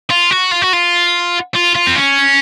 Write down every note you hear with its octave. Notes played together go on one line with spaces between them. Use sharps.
F4
F#4
F4
F#4
F4
F4
F4
C4
C#4